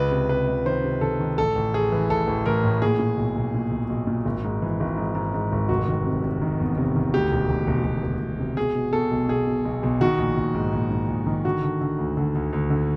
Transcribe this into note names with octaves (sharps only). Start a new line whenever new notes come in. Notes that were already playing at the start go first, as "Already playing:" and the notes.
Already playing: C#2 B4
C3
C3 B4
C#2
D#3 C5
C3
D#3 A4
D#3
A1 A4
A1
A1 G#4
E3
A1 A4
A1
A1 A#4
A2
A#2 G#4
A#2
B1
B1
A#2
B1
B1
A#2
G#1
G#2
E3
G#1
G#2
G#2
G#2
G#1
F1 F#4
D#3
C3
C3
D#3
E2
C3
D#3
D2 G4
E1
E1
E1
E1
E1
E1
C3
B2 G#4
B2
B2 A4
B1
B2 G#4
B2
B1
B1
D#3 F#4
A#1
A#1
G#2
A#1
G#2
A#1
D#3
D3 F#4
D3
D3
D2
D3
D2
D2
D3